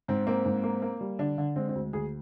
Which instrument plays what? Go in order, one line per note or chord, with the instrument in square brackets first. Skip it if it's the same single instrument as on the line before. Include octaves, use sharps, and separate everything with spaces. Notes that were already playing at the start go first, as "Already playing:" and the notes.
[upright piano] G#2 C4
A#3 C4
G#2
A#3
A#3
G3
D3 D4
D3
G#3 C4
C4
D2
D2 G#4